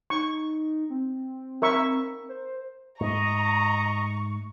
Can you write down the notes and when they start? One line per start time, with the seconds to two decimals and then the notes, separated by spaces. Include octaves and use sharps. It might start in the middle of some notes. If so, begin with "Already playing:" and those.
0.10 D#4 C#6
0.90 C4
1.62 A#4 E5 C#6
2.29 C5
3.00 G#2 A3 D#5 A#5 C#6